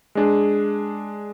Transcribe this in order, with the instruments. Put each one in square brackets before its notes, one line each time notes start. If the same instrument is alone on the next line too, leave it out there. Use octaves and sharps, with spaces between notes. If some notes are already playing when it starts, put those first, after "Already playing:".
[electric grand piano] G#3 D4 G#4